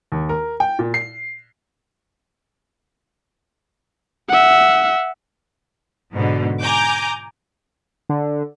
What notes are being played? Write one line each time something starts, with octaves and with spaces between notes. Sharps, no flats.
D#2
A#4
G5
A#2
C7
E5 F#5
G#2 B2 D3
G#5 A#5 D6 G6
D3